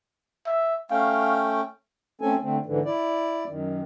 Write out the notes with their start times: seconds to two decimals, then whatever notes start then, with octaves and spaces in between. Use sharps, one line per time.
0.46 E5
0.90 A3 C#4 F5 G5
2.21 A3 C4 C#4 A4 G#5
2.42 D3 A3 C4
2.66 G#2 D3 E3
2.85 E4 D5
3.49 F#2 D#3